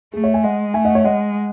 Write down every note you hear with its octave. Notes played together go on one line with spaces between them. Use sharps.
A3 G#4
C#5 E5
E5 G#5
G#3 D#5 F#5
A3 E5 G#5
D#5 F#5
C#5 E5
G#3 D#5 F#5